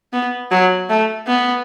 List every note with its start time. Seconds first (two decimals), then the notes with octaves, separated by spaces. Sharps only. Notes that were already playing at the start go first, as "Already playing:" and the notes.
0.13 B3
0.51 F#3
0.89 A3
1.27 B3